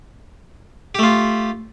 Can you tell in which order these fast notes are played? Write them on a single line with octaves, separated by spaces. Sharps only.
G4 A3 F4